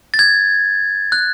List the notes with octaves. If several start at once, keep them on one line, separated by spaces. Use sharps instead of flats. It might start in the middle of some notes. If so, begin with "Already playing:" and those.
A6
G#6
F#6